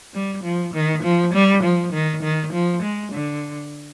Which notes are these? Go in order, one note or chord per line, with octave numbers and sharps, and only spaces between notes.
G3
F3
D#3
F3
G3
F3
D#3
D#3
F3
G#3
D3